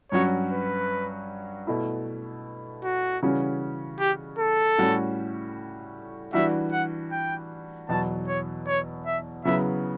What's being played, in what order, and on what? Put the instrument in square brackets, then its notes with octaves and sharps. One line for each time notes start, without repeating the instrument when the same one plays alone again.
[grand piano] G2 F#3 C#4 F#4 [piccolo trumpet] C#5
[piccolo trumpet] B4
[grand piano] B2 A3 E4
[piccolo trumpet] F#4
[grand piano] C#3 E3 G3 C#4 F#4
[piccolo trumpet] G4
A4
[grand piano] A2 G3 C#4 F#4
[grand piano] E3 G3 D4 F#4 [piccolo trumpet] E5
[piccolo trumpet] F#5
G5
[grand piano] E2 B2 F#3 [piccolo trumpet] A5
[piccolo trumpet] C#5
C#5
E5
[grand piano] C#3 F#3 B3 E4 [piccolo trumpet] E5